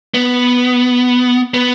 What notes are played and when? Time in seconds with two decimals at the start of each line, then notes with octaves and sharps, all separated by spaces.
0.14 B3
1.54 B3